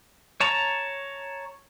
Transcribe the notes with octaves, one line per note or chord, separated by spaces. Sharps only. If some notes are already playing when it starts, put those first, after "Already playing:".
C#5 A5 A#5